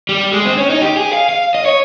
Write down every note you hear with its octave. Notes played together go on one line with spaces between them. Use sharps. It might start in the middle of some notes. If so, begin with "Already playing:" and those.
G3
G#3
C4
C#4
D#4
G4
G#4
F5
F5
D#5
C#5